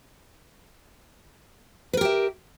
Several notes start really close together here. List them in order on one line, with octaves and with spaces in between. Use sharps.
B4 A#4 G4 E5